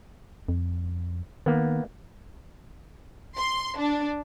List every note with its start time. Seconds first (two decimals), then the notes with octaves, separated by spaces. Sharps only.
0.49 F2
1.46 D#3 A#3 B3
3.38 C6
3.79 D4